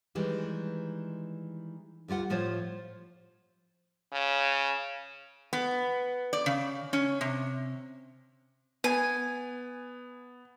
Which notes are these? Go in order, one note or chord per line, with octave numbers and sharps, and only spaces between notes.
D#3 E3 G3 G#3
D2 G3 F4 F#5
A2 F3 F4 C5 C#5
C#3
B3
D5
C#3
C#4
C3
B3 G#5